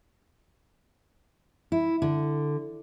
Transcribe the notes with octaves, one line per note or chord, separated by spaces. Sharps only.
E4
D3